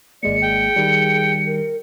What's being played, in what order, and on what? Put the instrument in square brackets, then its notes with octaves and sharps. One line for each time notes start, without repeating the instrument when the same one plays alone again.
[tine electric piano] G#1 G#3 A#3 [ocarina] D5 [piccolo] C#7
[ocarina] G#4 [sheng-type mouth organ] G5
[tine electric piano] D#3 G3
[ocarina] A#4